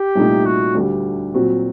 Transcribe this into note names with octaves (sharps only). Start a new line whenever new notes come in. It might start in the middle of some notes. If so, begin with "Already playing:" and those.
Already playing: G4
C2 A#2 A3 D#4
F#4
D2 D3 G3 D4 G4
A#2 F#3 C4 F#4